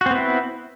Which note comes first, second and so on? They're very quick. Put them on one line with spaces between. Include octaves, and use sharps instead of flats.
F#4 C4 B3 E4